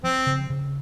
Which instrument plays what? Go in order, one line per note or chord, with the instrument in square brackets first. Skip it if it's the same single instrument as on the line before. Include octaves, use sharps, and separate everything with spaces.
[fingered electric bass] F3 [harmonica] C4
[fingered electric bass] C#3
C#3